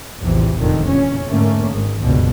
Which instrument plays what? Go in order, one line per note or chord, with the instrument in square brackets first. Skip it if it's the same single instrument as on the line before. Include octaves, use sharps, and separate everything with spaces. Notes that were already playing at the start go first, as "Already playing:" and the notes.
[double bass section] A#1 E2 A2 C3 E3
F1 A#2 D3 D#3
E2 A#2 C#4
G#2 D3 A3 A#3 C#4
G#1 G#3
F#1 C#2 G2 B2 D3